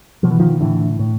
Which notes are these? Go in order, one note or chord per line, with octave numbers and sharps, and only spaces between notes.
B2 F3
E3
D#3 F3
A2 D3 E3
A2